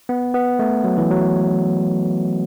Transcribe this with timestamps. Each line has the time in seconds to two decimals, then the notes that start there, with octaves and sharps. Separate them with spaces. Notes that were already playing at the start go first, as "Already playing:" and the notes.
0.09 B3
0.34 B3
0.59 A3
0.84 F#3
0.98 E3
1.11 F#3